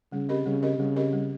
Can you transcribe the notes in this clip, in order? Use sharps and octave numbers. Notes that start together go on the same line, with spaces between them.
C#3 G3
C4 G4 A#4 D#5
C#3 G3
C4 G4 A#4 D#5
C#3 G3
C4 G4 A#4 D#5
G3